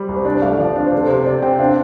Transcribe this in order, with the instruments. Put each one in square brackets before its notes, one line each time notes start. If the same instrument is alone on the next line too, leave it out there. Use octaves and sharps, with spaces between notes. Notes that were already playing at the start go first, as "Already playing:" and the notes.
Already playing: [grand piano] G3 [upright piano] C5
[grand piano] C2
[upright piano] C5
[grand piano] D4 [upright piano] D5
[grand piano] A3 [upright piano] F5
[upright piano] F5
[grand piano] F3 [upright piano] D5
[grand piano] D4 [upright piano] D5
[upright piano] C5
[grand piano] C3 [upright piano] A4
[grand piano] C3 [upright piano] C5
[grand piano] C3 [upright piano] D5
[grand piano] C4 [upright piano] G5
[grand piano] D4 [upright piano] F5
[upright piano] D5